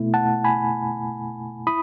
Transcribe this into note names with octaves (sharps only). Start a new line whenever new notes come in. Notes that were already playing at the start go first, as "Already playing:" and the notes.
Already playing: B2 A3 E4
F#5 A5
G#5 B5
E4 B5 D#6